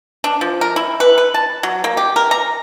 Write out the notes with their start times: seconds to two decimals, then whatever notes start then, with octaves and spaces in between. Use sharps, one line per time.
0.24 D4
0.41 F3
0.61 A#4
0.76 E4
1.00 B4
1.18 B4
1.34 A5
1.63 F#3
1.84 A#3
1.97 G4
2.16 A#4
2.31 A#5